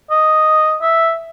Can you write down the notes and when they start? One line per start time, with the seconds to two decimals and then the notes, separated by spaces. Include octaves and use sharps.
0.11 D#5
0.82 E5